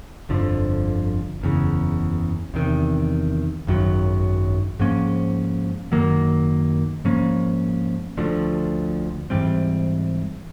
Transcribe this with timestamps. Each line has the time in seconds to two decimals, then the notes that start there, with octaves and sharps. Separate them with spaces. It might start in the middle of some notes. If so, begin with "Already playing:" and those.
0.29 G1 F2 D3 F3
1.41 F#1 E2 C#3
2.54 E2 C3 D#3
3.67 G#1 F#2 D#3 F#3
4.79 G#2 F3 A#3 C#4
5.92 F#2 D#3 F#3 A#3
7.05 G#2 F3 A#3 C#4
8.17 D2 D3 F3 A3
9.30 G#2 E3 G3 C4